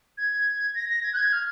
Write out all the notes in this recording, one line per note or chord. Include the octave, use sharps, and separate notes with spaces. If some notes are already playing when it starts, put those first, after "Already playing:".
G#6
A#6
A#6
G#6
F#6
G#6
F6